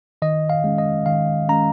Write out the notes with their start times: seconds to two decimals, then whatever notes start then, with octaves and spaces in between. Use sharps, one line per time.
0.22 D#3 D#5
0.50 F5
0.64 G#3 C#4
0.78 D#5
1.06 D#3 F5
1.49 G#3 C#4 A#5